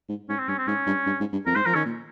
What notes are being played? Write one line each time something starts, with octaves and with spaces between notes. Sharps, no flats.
G#2
G#2 C#4
C4
G2 C#4
C4
G#2 C#4
G2
G2
G#2
G2
F2 A#4
G#2 C5
F3 A#4
D#3 C#4
A#2